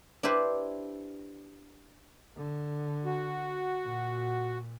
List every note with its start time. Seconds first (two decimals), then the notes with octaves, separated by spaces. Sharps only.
0.23 D4 E4 G4 B4 C5
2.36 D3
3.05 F#4
3.84 A#2